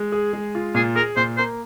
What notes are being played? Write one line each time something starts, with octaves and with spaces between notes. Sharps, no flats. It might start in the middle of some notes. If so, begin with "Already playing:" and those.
Already playing: G#3
G#4
G#3
F4
A#2 G#4
G#4 A#4
A#2 C5
A#3 C5